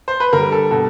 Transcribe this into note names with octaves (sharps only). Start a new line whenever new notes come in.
C5
B4
D3 G3 A#4
A4
B2 G3 A4